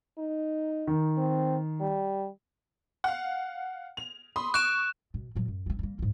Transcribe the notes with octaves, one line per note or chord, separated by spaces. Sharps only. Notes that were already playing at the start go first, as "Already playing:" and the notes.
D#4
D#3
C4
G3
F5 F#5
F7
B5 C6 D#6
C#6 F#6 D7 E7
B2
A#2 F#3
F#2
A#3 C4
G3 A#3
D2 G#2